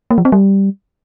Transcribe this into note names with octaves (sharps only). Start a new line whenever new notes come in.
A#3
F3
C4
G3